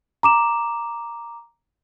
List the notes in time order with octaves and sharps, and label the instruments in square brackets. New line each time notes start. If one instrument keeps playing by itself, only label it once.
[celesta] A#5 D6 E7